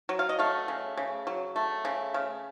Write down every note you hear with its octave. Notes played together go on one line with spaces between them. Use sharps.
F#3
F5
D#5
A3 C#5 F5
C#3
C#3
F#3
A3
C#3
C#3